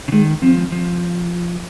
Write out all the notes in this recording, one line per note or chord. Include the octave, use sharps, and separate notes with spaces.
C#3
D#3 G#3
F3 C4
F3